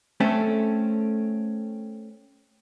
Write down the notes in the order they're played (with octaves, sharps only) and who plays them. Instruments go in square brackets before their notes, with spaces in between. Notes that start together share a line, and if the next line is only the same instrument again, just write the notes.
[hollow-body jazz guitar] A3 C4 C#4 A4